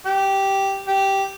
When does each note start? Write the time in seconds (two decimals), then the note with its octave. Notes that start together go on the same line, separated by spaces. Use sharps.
0.06 G4
0.87 G4